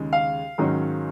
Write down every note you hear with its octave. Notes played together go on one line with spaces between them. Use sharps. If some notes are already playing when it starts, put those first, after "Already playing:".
Already playing: D#2 C#3 G#3 D#4
F5
G#2 D#3 F#3 C#4